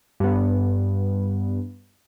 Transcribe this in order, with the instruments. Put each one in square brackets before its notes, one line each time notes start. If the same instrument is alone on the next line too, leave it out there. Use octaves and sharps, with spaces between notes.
[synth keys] G2 B3